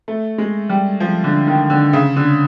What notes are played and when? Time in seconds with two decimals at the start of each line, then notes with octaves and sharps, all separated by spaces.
0.08 A3
0.38 G#3
0.69 G3
1.00 F3
1.24 D3
1.47 D#3
1.70 D3
1.93 C#3
2.16 D3